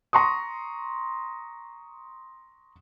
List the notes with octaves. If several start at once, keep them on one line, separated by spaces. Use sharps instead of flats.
A#5 C6 C#6 D#6